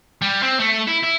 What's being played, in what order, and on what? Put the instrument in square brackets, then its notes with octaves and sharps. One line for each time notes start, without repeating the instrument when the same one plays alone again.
[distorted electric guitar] G3
C4
A3
E4
E4